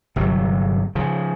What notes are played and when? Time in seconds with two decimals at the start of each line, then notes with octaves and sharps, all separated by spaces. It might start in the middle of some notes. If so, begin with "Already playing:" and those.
0.16 G1 C3 F#3
0.95 C#3 F3